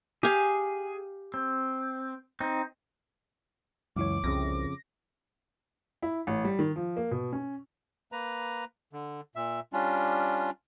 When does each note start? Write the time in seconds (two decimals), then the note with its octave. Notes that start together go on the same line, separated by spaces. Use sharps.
0.23 G4 G#4 F5 G#5
1.34 C4
2.41 C4 D#4
3.96 C#2 F#2 E3 C#5 D6
4.24 C2 F2 C#3 A#6
6.02 E4
6.27 A1
6.44 G3
6.59 D#3
6.76 F3
6.97 A#3
7.11 B2
7.33 C#4
8.12 A#3 B4 A#5
8.93 D3
9.36 A#2 E5
9.73 G3 C#4 D4 F4